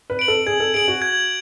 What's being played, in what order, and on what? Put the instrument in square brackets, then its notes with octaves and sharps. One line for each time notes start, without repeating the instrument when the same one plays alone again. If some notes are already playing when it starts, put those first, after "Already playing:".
[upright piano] B4
[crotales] D7 F#7
[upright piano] A4
[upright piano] G#4 [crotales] G#6
[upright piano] A4
[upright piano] G#4 [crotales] D7 F#7
[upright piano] F#4
[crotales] G#6